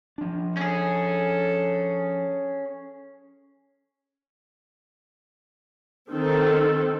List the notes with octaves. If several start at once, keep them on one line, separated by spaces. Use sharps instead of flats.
F3 D4
C#4 G#4 A4
D#3 C4 A4